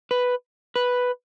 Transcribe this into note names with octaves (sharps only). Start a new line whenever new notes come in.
B4
B4